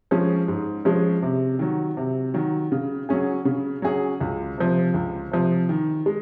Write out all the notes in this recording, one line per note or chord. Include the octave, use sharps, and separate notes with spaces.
F3 G#3 C#4
G#2
F3 G#3 C#4
C3
D#3 F#3
C3
D#3 F#3
C#3
F#3 C#4 G#4
C#3
F#3 C#4 G#4
C#2
C3 F3
C#2
C3 F3
D#3
G#3